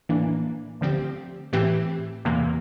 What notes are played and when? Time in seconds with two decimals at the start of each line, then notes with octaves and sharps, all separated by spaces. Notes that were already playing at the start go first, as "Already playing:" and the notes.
0.09 A2 E3 A#3 D4
0.81 D2 D3 F3 C4 G4
1.53 A2 E3 A3 C4 G4
2.25 E2 C3 E3 A#3